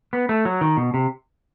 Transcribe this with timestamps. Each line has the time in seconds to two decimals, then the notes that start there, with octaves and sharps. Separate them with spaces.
0.13 B3
0.29 A3
0.45 F#3
0.61 D#3
0.77 B2
0.94 C3